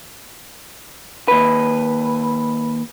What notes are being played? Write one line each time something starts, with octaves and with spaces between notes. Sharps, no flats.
D#2 A#2 B4